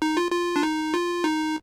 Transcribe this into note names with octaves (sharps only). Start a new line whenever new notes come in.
D#4
F4
F4
D4
D#4
F4
D#4